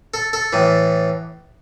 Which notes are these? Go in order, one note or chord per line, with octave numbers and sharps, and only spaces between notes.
A4
A4
A2 E3